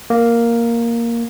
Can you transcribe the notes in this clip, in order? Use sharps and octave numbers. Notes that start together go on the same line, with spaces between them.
A#3